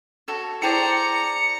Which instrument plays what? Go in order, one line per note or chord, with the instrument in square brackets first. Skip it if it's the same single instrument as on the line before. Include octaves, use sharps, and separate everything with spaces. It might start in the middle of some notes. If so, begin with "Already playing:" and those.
[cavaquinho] F#4 A4 C#5
[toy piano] E4 G5 A5 [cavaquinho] G#4 C5 D5 [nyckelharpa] A#5 [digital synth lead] C#7